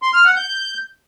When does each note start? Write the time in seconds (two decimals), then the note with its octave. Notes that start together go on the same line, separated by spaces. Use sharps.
0.02 C6
0.13 F6
0.25 F#5
0.36 G6